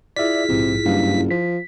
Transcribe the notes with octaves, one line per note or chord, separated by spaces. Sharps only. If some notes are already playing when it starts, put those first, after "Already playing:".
E4 F4 G#4 D5 E5 B6
A#1 G#2 C3
F#1 G2 G4 F5
F3 B6